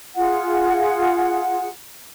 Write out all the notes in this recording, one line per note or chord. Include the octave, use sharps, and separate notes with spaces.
F4 G#4 F#5